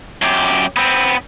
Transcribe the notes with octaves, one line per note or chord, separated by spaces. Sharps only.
F#2 G4
B3 C4